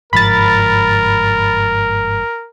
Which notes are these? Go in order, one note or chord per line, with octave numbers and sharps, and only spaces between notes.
G1 G#2 F3 A#4 B5 A6